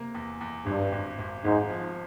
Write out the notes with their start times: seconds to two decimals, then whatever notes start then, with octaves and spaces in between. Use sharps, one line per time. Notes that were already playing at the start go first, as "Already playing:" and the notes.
Already playing: C3 A#3
0.14 E2
0.41 E2
0.66 G#1 G2
0.92 G#1
1.19 G#1
1.44 G#1 G#2
1.70 F3